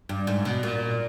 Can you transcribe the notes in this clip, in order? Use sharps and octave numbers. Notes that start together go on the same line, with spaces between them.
G2
G#2
B2
A#2